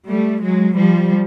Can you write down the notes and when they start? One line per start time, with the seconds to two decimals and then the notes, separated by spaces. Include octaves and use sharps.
0.08 G3 A3
0.42 F#3 G#3
0.76 F3 G3